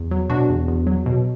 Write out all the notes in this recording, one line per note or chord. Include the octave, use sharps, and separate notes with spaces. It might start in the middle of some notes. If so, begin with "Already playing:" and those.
Already playing: E2
F#3
B2 D4 F#4
E2
E2
F#3
B2